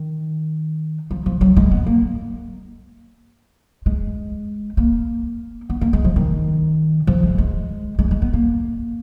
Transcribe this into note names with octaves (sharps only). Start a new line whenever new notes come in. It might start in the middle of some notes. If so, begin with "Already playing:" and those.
Already playing: D#3
F3
F3
F#3
G#3
B3
A#3
G#3
A#3
B3
A#3
G#3
F3
D#3
F3
G#3
G#3
G#3
G#3
B3
A#3